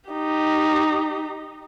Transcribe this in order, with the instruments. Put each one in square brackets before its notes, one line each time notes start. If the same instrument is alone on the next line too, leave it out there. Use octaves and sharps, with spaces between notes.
[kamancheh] D#4 G4